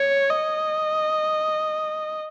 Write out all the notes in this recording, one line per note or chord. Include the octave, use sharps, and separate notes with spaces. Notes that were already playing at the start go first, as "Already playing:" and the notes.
Already playing: C#5
D#5